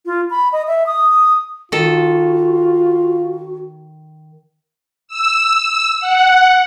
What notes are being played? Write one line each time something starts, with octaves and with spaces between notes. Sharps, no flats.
F4
B5
D#5
E5
D#6
D#3 F4 F#4 A4
E6
E6
F#5